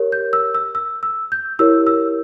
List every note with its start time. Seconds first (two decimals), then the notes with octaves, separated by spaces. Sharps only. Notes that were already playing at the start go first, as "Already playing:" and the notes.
Already playing: G4 A#4 C#5
0.12 G6
0.33 E6
0.55 E6
0.75 E6
1.03 E6
1.32 G6
1.59 E4 G4 A#4 C#5 E6
1.87 E6